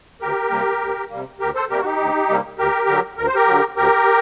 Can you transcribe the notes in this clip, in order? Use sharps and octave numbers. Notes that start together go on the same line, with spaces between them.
D2 G4 A#4
C3 G3 A#3
D2
C3 G3 A#3
D2 G4 A#4
A4 C5
C3 G3 A#3 G4 A#4
F#4
D#4 G4
D2
C3 G3 A#3
D2 G4 A#4
D3 F#3
D2 A#4
C5
G4 A#4
D3 F#3
D2 G4 A#4